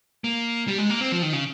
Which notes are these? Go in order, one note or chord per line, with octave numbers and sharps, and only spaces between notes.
A#3
G3
G#3
A#3
C4
F3
D#3
C#3